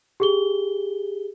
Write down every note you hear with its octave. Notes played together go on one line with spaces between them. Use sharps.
G4 G#4 G7